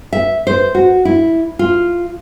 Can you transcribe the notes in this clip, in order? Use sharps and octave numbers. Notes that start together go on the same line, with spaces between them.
E5
C5
F#4
E4
F4